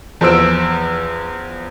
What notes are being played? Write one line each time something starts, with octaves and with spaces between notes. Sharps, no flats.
E2 F3 C5 E6 D7